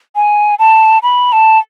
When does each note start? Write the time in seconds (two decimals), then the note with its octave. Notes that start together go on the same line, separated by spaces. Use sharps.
0.15 G#5
0.59 A5
1.03 B5
1.32 A5